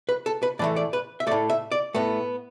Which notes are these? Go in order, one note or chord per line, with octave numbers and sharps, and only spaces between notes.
B4
A4
B4
A2 E3 A3 D5
D5
B4
E5
A2 A3 D5
E5
D5
A2 A3 B3